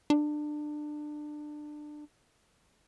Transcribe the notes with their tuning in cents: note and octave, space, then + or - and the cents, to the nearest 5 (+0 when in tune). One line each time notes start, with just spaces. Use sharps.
D4 +25